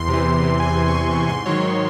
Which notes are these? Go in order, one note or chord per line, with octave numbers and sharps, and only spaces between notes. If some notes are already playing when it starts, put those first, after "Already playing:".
Already playing: E2 C6
C3
E3
E2
C3 E3
E2 G#5
C3 E3
C#6
E2 C6
C3 E3 C#6
G#2 C6
D#3 F#3 C#5
G#2 C#5